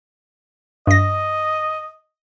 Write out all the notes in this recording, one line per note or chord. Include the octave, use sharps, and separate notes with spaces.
G2 D#5 A#6